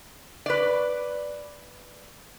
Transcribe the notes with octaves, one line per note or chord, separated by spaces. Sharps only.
B4 D5